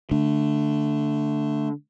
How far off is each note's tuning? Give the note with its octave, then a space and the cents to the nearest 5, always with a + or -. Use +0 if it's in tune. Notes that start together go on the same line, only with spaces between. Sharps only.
D3 +0 A3 +0 D4 +0